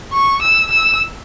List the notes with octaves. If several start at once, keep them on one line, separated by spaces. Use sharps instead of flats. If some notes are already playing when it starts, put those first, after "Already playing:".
C#6
E6
E6